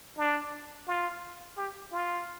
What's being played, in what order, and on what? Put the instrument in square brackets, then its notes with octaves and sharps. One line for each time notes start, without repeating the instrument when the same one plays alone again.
[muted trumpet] D4
F4
G4
F4